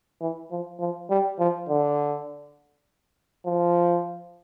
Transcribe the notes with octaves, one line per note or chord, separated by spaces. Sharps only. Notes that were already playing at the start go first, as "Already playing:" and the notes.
E3
F3
F3
G3
F3
D3
F3